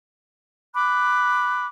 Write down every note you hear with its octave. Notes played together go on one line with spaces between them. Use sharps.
B5 D6 F#6